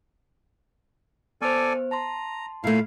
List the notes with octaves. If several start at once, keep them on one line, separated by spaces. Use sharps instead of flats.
B3 A4 C5 D5 G#5
A5 A#5 C6
A#2 A3 E4 F5